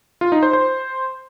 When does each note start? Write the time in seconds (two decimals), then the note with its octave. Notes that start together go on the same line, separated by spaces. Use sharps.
0.21 F4
0.32 D#4
0.43 C5
0.53 C5